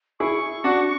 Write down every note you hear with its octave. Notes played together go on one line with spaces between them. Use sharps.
E4 G#4 C#6
D4 F#4